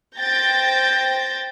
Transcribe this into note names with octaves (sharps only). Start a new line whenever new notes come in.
C5 G5 G6 A6 A#6